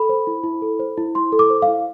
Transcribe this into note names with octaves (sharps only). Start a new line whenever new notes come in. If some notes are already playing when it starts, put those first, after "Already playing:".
Already playing: A4 B5
C5
E4
E4
A4
C5
E4
E4 C6
A4
D6
C5
F5
E4